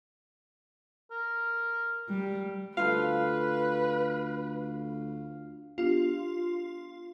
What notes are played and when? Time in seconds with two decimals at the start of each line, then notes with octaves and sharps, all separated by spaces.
1.11 A#4
2.09 G3
2.77 D2 F4 A4 B4 F5
5.78 B3 D4 F4 G4